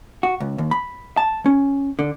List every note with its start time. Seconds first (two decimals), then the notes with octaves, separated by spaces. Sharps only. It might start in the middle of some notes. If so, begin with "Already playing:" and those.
0.23 F#4
0.40 C#2
0.58 D#2
0.71 B5
1.17 A5
1.46 C#4
1.99 D3